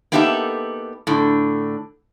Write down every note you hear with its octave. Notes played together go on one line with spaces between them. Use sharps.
A#3 B3 D#4 G4 A4 E5
A2 D3